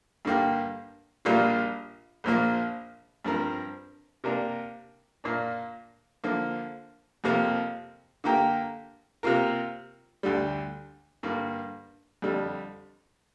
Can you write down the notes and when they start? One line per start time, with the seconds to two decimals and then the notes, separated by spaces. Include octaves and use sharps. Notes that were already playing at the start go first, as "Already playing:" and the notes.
0.25 G2 D3 A#3 G4
1.25 A#1 A#2 G3 A#3 F4
2.24 A#1 A#2 F3 A#3
3.25 G2 F3 C4 A#4
4.24 C3 A#3 D4 A#4
5.24 A#2 A#3 D4
6.24 D3 F3 A#3
7.24 F2 C3 F3 A#3
8.24 D3 A#3 G4 A#4
9.23 C3 A#3 F4 A#4
10.23 D2 D3 G3
11.23 G2 D3 A#3
12.22 F2 D3 G3